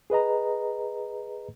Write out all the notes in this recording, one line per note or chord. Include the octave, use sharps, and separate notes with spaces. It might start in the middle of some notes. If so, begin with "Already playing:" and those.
G#4 B4 D#5 A#5